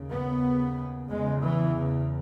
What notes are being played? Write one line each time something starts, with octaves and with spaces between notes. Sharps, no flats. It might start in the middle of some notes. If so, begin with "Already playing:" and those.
Already playing: D#2 C#3
B3
E2 C#3 G#3
E3
C#3